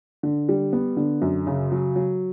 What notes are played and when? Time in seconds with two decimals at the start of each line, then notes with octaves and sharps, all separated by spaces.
0.23 D3
0.49 G3
0.73 B3
0.97 D3
1.21 F#2
1.47 C#3
1.72 F#3
1.96 F#3